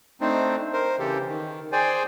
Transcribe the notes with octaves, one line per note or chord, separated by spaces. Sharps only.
A3 C4 D4 D#4 C5
A#4 C5
C#3 E3 G4 A4
D#3
G#4 C5 D5 G5 G#5